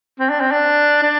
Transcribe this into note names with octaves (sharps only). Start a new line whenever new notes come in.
C4
D4
C4
D4
D4